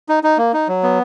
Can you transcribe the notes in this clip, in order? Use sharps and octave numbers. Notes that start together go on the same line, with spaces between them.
D#4
D#4
A#3
D#4
F#3
B3